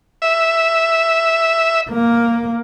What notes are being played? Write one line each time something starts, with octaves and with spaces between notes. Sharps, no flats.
E5
A#3